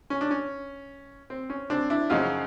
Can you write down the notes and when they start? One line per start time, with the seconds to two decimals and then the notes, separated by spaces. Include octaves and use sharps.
0.10 C#4
0.21 D4
0.31 C#4
1.30 C4
1.50 C#4
1.70 C4 D4
1.90 D4 E4
2.10 F#2 C#3 F3 D#4 F4